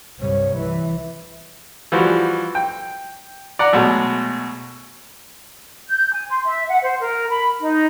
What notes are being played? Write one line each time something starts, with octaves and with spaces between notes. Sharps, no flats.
C2 G2 C#5
E3 E5
E3 F3 G3 F#4
G5
D5 F#5 A#5
B2 F#3 G#3 A3
G6
G#5
C6
E5
F#5
C5
A#4
B5
D#4